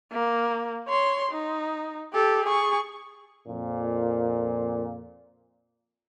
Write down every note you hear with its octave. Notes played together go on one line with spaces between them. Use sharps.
A#3
C#5 C6
D#4
G4 A4
G#4 C#6
F2 A#2